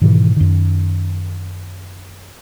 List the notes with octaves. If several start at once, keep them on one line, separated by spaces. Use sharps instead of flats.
G#2 B2 D#3 E3
F#2 D#3